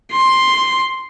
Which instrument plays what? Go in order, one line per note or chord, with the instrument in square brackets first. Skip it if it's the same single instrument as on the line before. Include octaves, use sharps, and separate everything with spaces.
[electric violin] C6